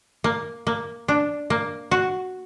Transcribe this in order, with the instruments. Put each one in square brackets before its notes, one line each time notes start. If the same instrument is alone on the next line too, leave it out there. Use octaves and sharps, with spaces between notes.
[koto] A#3
A#3
D4
A#3
F#4